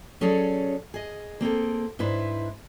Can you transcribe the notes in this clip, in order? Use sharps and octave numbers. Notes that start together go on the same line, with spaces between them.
F#3 C#4 G#4 A4 C#5 D5
G#4 D#5
A#3 C4 G#4 A4
G#2 D4 E4 B4 C5